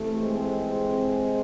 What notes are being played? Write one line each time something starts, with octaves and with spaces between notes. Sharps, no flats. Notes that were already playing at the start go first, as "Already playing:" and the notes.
Already playing: C3 E3 A3
G#3 C4